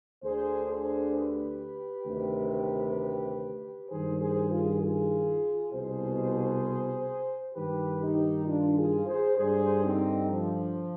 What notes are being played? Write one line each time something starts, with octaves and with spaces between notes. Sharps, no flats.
D2 D3 G#4 C5
G#4 C5
G4 B4
D2 C3 D#3
G2 D#3 G#4 C5
G#4 C5
F4 G#4
F4 G#4
C2 B2 G#4 C5
G2 D#3 G4 B4
D#4 G4
D4 F4
F4 G#4
G#4 C5
G2 D3 G#4 C5
C4 D#4
F3